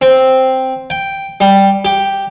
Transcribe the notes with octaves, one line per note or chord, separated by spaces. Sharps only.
C4
G5
G3
G4